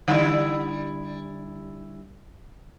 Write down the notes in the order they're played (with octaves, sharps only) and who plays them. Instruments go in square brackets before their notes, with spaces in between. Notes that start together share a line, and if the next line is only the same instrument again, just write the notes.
[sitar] D3 G3 E4